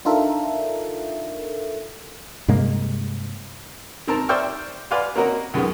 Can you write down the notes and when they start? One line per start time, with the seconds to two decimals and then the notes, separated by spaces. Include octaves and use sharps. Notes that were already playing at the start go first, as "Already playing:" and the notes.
0.05 D4 D#4 F4 A4 A#4 E5
2.48 G2 C3 G#3 A#3
4.07 D#3 C4 A#4 A5 A#5
4.29 C5 D5 E5 G5 C#6 F6
4.91 B4 D5 F5 F#5 G#5 C6
5.16 A#3 C4 C#4 F#4 A#4 D#5
5.54 C#2 F#2 D#3 G#3 B3